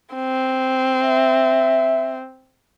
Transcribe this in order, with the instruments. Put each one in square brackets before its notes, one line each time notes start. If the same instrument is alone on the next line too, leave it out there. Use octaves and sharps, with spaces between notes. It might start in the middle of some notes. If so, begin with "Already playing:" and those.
[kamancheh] C4
[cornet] E5